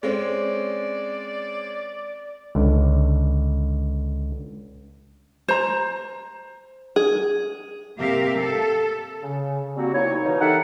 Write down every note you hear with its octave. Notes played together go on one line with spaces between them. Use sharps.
G#3 C4 C#4 D5
C#2 D3
C5 A#5
G#4
C3 A#3 G4 A#4 E5 F5
A4
C#3
F#3 G3 A#3 C4 F#4
C2 F#3 A#3 D#4 E4 C#5
B2 E3 D#4
G4 A4 A#4 E5 F#5